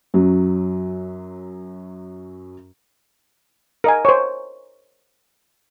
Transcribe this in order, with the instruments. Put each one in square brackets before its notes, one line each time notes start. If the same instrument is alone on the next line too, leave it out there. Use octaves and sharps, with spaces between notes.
[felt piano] F#2 F#3
[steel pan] A#4 D#5 G#5
C5 C#5